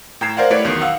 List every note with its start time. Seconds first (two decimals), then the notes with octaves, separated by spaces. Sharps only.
0.21 A2 G5 A#5 G#6 C7 E7
0.37 A#4 C5 D5 F5 F#5
0.50 A3 E4 G4 B4 C#5 D5
0.65 B1 E2 D#3 B3
0.81 F5 F#5 E6